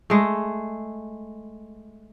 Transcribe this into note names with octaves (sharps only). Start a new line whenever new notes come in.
G#3 A3